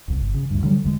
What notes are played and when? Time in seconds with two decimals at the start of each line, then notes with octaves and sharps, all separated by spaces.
0.08 D#1 C2
0.21 G1
0.34 C#3
0.50 D2 G2
0.63 D3 F#3 G3
0.84 E1 D3 G#3